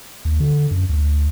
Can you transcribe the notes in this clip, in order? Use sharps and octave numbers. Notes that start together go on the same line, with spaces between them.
D#2
D3
F#2
D2